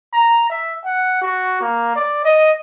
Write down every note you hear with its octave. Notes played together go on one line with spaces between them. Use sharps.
A#5
E5
F#5
F#4
A#3
D5
D#5